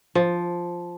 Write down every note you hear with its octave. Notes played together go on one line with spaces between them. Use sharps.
F3